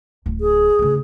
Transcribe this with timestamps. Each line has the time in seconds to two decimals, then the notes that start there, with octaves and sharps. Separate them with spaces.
0.26 D1
0.41 G#4
0.79 D2 C#3